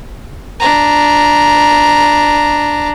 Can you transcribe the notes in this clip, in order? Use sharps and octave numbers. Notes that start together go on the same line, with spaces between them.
D4 A#5